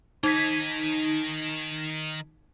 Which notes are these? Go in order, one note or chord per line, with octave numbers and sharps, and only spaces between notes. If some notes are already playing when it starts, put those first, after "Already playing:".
D#3 D#4 D#5 G#6 B6